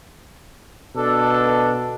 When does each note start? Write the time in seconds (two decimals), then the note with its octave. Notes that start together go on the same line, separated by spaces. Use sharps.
0.96 B2 D4 A4